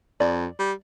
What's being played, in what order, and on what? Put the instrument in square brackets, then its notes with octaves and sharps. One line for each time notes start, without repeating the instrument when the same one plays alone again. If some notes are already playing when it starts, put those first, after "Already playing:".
[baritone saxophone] F2 [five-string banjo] D5
[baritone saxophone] G3